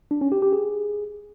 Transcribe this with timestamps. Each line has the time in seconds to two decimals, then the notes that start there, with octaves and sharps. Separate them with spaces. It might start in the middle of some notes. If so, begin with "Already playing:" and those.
0.11 D4
0.21 C#4
0.32 G4
0.42 G4
0.53 G#4